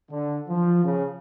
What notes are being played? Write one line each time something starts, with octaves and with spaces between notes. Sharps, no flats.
D3
F3
C#3